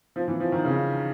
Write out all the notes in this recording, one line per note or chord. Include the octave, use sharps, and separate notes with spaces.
F3
E3
F3
D#3
C#3